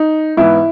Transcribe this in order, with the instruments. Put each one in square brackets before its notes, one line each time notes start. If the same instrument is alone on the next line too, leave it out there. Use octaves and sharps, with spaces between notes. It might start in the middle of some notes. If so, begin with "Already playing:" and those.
Already playing: [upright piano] D#4
G#2 E3 B3 E4